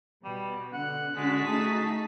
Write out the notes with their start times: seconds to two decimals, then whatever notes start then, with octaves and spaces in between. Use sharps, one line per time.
0.24 B2 G3
0.73 D3 F#5
1.16 D3 G#3 C#4 F#4 A5 B6
1.46 A3 D#4 G#4